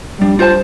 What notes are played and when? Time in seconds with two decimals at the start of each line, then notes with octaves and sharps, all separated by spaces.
0.20 G3 D4
0.39 F4 C5 A5